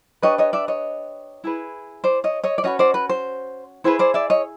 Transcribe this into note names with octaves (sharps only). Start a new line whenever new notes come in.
D4 G4 B4 C#5 D#5
C#5 D#5
D5 E5
C#5 D#5
E4 G#4 B4
C5 D5
C#5 D#5
C#5 D#5
D5
C#4 F#4 B4 C#5 D#5
C5 D5
B4
C5
E4 G#4 B4 C5
C5 D5
D5 E5
C#5 D#5